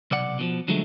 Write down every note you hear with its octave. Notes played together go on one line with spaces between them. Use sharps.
B1 C3 D5 F#5
B2 D#3 F3
D3 F3 F#3 G#3 A3